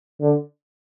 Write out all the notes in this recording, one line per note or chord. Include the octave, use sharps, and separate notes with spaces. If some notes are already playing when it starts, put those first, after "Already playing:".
D3